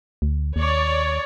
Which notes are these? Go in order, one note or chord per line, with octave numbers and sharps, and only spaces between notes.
D2
D#2 C#5 D5